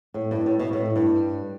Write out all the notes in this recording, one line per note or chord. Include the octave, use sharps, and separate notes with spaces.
A2
G2
A2
B2
A2
G2